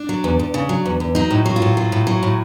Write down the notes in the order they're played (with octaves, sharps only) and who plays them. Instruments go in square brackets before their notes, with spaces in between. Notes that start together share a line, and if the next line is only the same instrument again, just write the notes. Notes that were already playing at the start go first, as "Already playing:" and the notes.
Already playing: [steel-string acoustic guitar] D4
F#3
E2
E2
C#3
F#3
E2
E2
F#3 D#4
A2
F#3
F4
A2
F#3
A2
F#3
A2